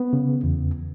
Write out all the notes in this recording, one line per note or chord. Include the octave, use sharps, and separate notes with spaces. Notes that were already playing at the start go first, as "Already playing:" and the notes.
Already playing: B3
C#3
E2